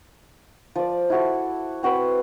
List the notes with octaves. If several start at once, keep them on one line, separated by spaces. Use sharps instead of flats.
F3 D5
E4 F#4 A4
C4 F#4 B4 B5